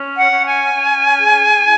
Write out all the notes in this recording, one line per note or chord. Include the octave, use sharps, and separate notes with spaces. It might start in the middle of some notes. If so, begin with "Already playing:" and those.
Already playing: C#4
F#5
C#4
G#5
C#4
G#4
E4